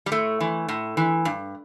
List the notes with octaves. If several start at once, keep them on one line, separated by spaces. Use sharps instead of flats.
G3
A2 A3
E3
A2
E3
G2